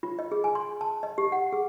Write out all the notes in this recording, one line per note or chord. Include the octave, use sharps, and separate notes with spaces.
F4
D#5
G#4
G#5
C6
A5
D#5
G4
F#5
G#4